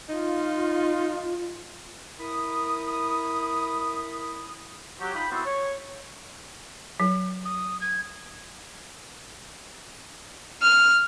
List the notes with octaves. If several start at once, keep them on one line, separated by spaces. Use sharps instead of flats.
D#4 F4
E4 A#4 B5 D#6
F#3 G4
D#4 F4 G5 B5
B3 C4 E4 F#4 A4 C5
C#5
F#3
D#6
G#6
F6